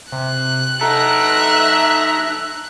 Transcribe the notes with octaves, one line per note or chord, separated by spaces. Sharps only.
C3 F#6
D#4 A4 E5 A#5